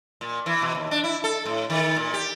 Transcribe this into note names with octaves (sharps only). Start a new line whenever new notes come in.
A#2
E3
B2
D#2
D4
E4
A4
A2
D#3
A#2
G4